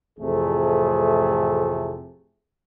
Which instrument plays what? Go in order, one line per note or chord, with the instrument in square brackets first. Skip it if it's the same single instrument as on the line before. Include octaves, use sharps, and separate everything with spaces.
[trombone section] A1 F2 A2 C3 A3 G#4